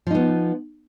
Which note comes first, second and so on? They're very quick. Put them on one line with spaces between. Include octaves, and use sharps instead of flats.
F3 D#4 B3